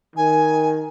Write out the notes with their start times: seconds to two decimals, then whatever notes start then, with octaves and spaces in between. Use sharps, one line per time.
0.16 D#3 G#5